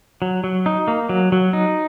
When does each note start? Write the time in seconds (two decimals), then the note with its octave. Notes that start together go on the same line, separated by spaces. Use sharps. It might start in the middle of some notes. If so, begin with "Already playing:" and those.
0.22 F#3
0.44 F#3
0.66 D#4
0.88 A#3
1.09 F#3
1.32 F#3
1.53 D#4